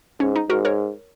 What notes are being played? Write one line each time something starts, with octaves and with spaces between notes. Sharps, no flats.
G#2 C#4
D#4
G#2 F#4 A#4
A#4 C#5